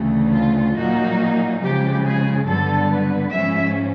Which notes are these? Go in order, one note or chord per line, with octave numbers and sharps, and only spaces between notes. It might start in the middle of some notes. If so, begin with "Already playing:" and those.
Already playing: D2 C#3 E3 A3
F4
A#2 F#3 A#3 D#4 F#4
C#3 F3 G#3 G4
G#4
G2 D3 F#3 B3 A4
B4
G#2 F3 G#3 C#4 E5